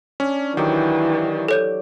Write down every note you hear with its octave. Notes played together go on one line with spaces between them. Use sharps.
C#4 D4
D#3 E3 F#3 G4
A4 C#5 G6